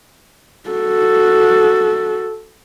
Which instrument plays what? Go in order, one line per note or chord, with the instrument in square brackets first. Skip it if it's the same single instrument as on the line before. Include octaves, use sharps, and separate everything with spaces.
[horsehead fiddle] F#4 A4